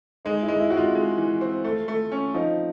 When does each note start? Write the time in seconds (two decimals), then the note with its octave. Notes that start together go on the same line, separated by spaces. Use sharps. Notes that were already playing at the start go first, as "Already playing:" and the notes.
0.25 G#3 D#4
0.42 E4
0.48 G#3
0.60 E4
0.70 G#3 F#4
0.77 F4
0.95 G#3
1.18 E3
1.41 C4
1.64 A3
1.88 A3
2.12 C#4
2.34 F3 D#4